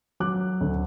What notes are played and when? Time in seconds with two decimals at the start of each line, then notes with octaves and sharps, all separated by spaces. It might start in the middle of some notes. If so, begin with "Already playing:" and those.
0.20 F#3 D6 F#6
0.61 D2